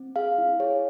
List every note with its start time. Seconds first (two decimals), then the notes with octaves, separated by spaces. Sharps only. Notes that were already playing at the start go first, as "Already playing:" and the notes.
Already playing: C4
0.16 G#4 F5
0.38 E4
0.60 G#4 C#5